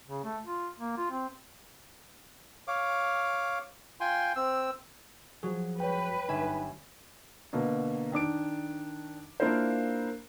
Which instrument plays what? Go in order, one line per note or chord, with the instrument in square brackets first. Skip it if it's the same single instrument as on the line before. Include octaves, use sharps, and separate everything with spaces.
[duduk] C#3
A3
F4
A#3
F4
C4
[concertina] C#5 F5 D6
F4 G5 G#5 C6
C4 E6
[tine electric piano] F3 F#4 G#4 [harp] F#3
[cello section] B4 [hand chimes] C#5 G5
[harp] G1 E5 G#5 [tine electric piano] D#4
[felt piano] B2 D3 A#3
D#3 D4 D6 D7
A#3 D4 E4 F4 A#4 C5